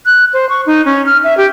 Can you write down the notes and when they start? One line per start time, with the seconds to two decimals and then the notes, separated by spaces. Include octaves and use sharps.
0.06 F#6
0.33 C5
0.49 C#6
0.66 D#4
0.86 C#4
1.06 F6
1.24 E5
1.37 G4